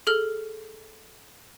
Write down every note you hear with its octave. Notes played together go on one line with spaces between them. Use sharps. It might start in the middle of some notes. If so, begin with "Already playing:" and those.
G#4 A4 F6